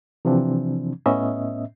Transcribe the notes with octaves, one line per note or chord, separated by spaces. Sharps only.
C3 E3 F3 C4 D4
A2 B3 C#4 D#5 E5